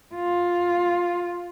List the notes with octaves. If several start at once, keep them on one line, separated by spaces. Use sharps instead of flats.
F4